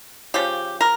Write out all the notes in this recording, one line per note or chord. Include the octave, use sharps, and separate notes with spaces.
C#3 F3 C#4 G4
A#4